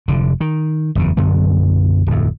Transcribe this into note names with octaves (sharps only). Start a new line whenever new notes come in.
F1 D3
D#3
F#1 E2 C#3
B1 F#2 D3 B3
D1 F2